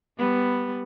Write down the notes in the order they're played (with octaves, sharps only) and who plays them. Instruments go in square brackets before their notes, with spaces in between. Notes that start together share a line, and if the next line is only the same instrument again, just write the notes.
[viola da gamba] G3 B3